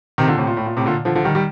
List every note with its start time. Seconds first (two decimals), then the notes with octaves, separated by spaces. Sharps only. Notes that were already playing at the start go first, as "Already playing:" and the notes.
0.18 C3 D#3
0.28 A#2 D3
0.38 A2 C3
0.47 A#2
0.57 A2
0.66 A#2
0.77 A2 C3
0.86 A#2 D3
1.05 D3 F3
1.15 D3 F3
1.24 D#3 G3
1.35 D#3 G3